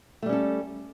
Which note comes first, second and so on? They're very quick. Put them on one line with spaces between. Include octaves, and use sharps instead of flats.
A3 G3 C#4 A4